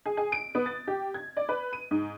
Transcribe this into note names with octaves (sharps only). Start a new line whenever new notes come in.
G#4
G#4
D7
B3
A6
G4
G#6
D5
B4
D#7
G#2